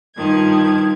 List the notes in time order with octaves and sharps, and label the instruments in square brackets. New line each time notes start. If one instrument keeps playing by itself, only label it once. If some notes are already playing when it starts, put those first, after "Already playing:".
[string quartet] G2 D#3 F3 G#6